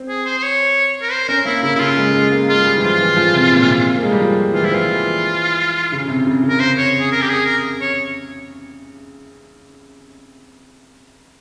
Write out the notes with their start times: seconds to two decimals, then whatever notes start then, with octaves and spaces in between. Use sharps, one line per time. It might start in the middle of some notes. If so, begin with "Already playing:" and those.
Already playing: C4
0.08 G#4
0.25 C5
0.38 C5
0.43 C#5
1.02 A#4
1.11 C5
1.28 C#4 A#4
1.45 A#3 E4
1.62 C#3 E4
1.75 E4
1.79 C#3 F4
1.97 G#3
2.14 G#3
2.31 A#3
2.48 G#3 F4
2.58 G#3
2.65 G3
2.77 E3
2.82 F3 F4
2.99 E3
3.16 F3
3.34 C3
3.52 A#2
3.68 C3
3.95 A#3
4.02 G#3
4.12 G3
4.20 F3
4.54 E3 F4
4.62 F3 E4
4.70 E3 F4
5.92 C#3
6.08 C3
6.26 C#3
6.43 C#3 A#4
6.59 C5
6.78 C#5
7.00 G#4
7.12 A#4
7.22 G4
7.29 G#4
7.45 A#4
7.81 C#5